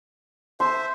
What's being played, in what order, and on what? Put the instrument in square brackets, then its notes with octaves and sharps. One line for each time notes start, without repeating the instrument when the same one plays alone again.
[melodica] C5 E5 [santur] C6